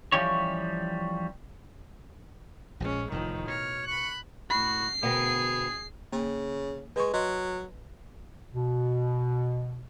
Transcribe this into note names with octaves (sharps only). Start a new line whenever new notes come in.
E3 F3 G3 C#4 G4 C#5
A#1 A#2 F3 G#3 C#4
F1 E2 A2 D#3 F3
B2 C#5 F6
B5 C#6 F#6
A2 F#4 B5 C7
D2 B2 B3 G#4 A#4 G5
C#3 A#3
G#3 B4 C#6
F#3 D#5 C6
B2